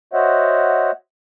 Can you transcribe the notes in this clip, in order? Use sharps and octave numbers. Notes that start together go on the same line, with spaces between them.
F#4 C5 C#5 D#5 E5 F#5